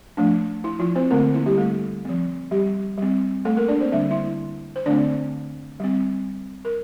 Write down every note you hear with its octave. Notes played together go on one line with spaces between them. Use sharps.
F3 A3 D4
E4
F3 F4
C4 C5
D3 A3 A#3 C4 A#4
E4
G3 G4
A3 A4
F3 C4
G3 G4
G3 C4
A3 A4
A#3 A#4
D4 D5
C4 C5
D3 G3 A#3 D4 E5
E4 E5
C5
D3 A3 C4 D4 D5
G3 C4
A#4